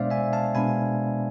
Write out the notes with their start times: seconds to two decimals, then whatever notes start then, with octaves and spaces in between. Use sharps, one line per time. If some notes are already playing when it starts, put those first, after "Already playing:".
Already playing: B2 G#3 B3 D4 C5 D5 E5 F5
0.10 E5 G#5
0.33 F5 A5
0.55 B2 G#3 B3 D4 G#5 B5